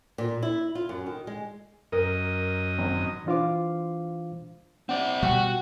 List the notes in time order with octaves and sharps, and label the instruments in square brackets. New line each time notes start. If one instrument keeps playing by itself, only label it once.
[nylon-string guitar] A#2
E4
F4
F#2
D#3
G#3
[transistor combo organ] F#2 D#5 [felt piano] A#4
[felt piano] G#1
[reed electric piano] E3 D4 F4 C5 F5 D6
[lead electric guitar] C4 D5 [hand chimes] F#5
[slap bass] B2 G3 [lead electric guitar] F#4 [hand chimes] G5 C#6